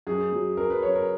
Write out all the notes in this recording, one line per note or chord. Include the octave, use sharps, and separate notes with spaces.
F#2 G#4
F#3
F#2 A#4
B4
F#2 C#5
A#4